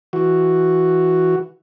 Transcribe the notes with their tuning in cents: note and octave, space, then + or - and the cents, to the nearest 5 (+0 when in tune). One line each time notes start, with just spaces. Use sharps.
E3 +0 F#4 +0